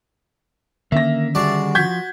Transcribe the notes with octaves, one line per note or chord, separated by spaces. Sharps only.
D3 D#3 A#3 C#4 E5 A#6
G3 F#4 G#4 D5 A5
F3 F#4 G6 G#6 B6